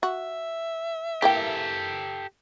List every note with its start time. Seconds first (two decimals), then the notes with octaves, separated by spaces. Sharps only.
0.03 F#4 E5
1.22 E3 A#3 G4 A4 G5